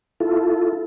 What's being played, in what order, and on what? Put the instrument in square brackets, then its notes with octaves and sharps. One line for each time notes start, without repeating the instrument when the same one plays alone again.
[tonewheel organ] E4 F4 A4